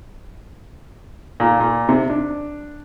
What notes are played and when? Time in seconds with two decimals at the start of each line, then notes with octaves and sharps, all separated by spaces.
1.40 A#2
1.60 A#2
1.89 C3
2.10 D4